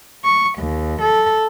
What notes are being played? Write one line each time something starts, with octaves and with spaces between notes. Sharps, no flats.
C#6
D#2
A4